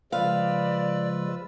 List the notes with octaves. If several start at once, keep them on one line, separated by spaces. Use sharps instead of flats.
C#3 F3 G#3 F4 B4 D5 F5 E6